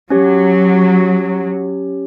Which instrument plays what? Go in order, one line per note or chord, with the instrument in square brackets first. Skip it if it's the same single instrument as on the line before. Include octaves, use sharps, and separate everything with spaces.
[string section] F#3 [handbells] C#4 G4 C#5